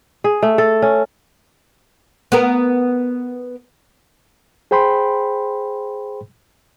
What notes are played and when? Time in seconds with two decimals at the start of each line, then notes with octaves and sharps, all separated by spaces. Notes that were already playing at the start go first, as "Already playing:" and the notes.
0.24 G#4
0.43 A3
0.58 A4
0.82 C#4
2.32 B3 A#4
4.71 G#4 C5 G5 B5 C6